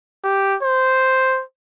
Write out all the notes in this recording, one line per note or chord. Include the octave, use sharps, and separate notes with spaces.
G4
C5